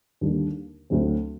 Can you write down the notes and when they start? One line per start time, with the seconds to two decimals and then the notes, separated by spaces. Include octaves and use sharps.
0.21 D#2 D3 G3 A#3
0.90 D2 D3 F#3 C4